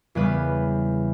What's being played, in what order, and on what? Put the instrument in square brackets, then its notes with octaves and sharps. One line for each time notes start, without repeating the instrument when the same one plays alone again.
[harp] E2 C#3 G3 B4